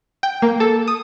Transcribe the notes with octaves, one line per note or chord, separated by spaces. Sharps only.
G5
A#3
A4
D#6